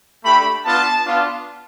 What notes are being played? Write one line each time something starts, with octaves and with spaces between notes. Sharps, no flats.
A3 D4 G4 B5
B3 D4 F4 A5
B3 D4 F4